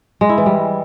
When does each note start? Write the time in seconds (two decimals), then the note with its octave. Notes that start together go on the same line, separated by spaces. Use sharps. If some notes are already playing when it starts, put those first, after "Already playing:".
0.21 G#3
0.29 E4
0.38 E3
0.46 G3